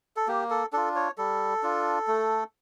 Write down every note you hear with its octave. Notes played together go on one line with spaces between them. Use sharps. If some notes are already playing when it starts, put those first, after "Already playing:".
A4
A#3 G4
A4
D4 F4 A4
C#5
G3 A4
D4 F4
A3